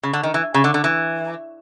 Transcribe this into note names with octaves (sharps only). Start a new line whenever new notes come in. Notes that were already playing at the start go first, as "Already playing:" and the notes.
C#3
D3
D#3
E3
C#3
D3
D3
E3